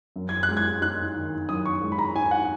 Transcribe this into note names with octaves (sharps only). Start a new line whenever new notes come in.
F#2
G#6
F#6
G#3
G#6
D#4 F#6
D#3
F#2 D#6
C#6
G#3
B5
A#5
D#4 G#5
F#5